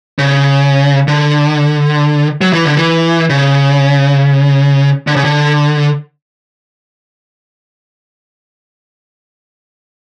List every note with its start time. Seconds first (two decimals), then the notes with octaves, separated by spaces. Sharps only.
0.19 C#3
1.08 D3
2.41 F#3
2.53 E3
2.65 D3
2.77 E3
3.30 C#3
5.07 D3
5.16 C#3
5.25 D3